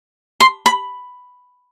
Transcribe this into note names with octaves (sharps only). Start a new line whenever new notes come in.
C6
B5